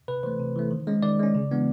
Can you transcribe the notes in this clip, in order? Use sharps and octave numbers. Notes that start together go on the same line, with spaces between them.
C3 B4
E3 A3 C5
C3
E3 A3
D#3
G#3 C#4
D#3 D5
G#3 C#4
C#3
E3 G#3 B3 D4